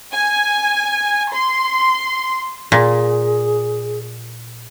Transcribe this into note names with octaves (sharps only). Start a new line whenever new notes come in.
G#5
C6
A#2 G#4